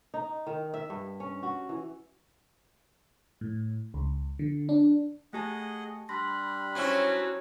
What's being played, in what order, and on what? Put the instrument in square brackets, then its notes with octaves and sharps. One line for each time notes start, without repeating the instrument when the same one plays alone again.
[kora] D#4
D#3
E5
G2
C#4
F#4
E3
[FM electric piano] A2
C#2
D3
D4
[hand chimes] A3 G4 A5 [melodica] G#4 D#5 F#5
[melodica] G3 D4 B5 [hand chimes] C6 A#6
[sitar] F#3 C4 E4 [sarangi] C#4